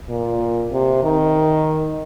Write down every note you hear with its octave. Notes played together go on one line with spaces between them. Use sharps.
A#2
C3
D#3